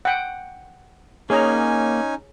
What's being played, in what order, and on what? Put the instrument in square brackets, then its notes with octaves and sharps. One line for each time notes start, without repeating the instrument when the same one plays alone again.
[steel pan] F#5 G5
[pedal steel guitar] A#3 [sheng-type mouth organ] C#4 D#4 G#5 [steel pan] G#4 C#5 A#5